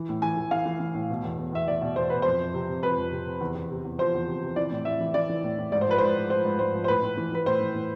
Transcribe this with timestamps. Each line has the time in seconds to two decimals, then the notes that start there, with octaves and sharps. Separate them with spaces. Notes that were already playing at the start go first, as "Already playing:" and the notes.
Already playing: E3
0.09 A2
0.22 E3 G#5
0.37 E3
0.51 E3 F5
0.65 E3
0.80 E3
0.94 A2
1.10 B2
1.24 E2
1.38 E2
1.52 E2 E5
1.68 E2 D5
1.81 B2
1.96 E2 C5
2.10 B2 B4
2.22 F2 C5
2.39 F2
2.54 C3
2.69 C3
2.83 F2 B4
2.98 F2
3.12 C3
3.26 C3
3.41 E2
3.55 E2
3.71 C3
3.84 E2
3.98 F3 C5
4.14 E2
4.28 C3
4.42 C3
4.56 E3 D5
4.71 A2
4.85 A2 E5
5.00 E3
5.14 E3 D5
5.29 E3
5.44 A2
5.58 A2
5.72 G#2 D5
5.81 C5
5.87 F3 B4
5.98 G#2 C5
6.16 G#2
6.30 F3 C5
6.45 G#2
6.59 G#2 C5
6.74 F3
6.84 C5
6.88 A2 B4
7.02 A2
7.17 E3
7.32 E3 B4
7.46 A2 C5
7.60 E3
7.75 A2